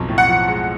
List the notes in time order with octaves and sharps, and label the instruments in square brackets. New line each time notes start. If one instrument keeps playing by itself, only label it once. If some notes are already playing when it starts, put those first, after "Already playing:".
Already playing: [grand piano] B1 F2
A2
[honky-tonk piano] F#5
[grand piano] F3
G#3